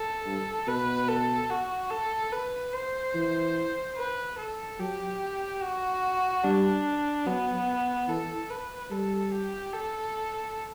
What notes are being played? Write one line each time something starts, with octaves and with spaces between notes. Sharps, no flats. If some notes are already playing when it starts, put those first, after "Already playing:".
Already playing: A4
G2
B2 B4
A4
F#4
A4
B4
C5
E3
B4
A4
F#3 G4
F#4
G3 D4
F#3 B3
E3 A4
B4
G3 A4
G4
A4